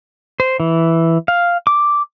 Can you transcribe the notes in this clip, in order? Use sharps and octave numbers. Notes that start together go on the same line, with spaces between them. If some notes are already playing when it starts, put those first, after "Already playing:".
C5
E3
F5
D6